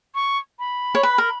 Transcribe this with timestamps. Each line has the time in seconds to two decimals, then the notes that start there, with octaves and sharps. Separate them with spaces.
0.15 C#6
0.59 B5
0.95 C#5
1.03 B4
1.18 A#4